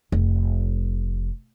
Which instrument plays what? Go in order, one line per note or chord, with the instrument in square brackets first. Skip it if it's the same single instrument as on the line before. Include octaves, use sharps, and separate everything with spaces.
[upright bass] F1